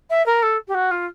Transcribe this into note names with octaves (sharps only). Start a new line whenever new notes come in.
E5
A#4
A4
G4
F#4
F4